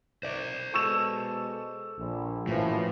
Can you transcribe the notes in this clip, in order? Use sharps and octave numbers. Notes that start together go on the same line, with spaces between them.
C5 D5
B2 G#3 A4 C#6 E6 E7
A#1
F#2 A2 E3 F3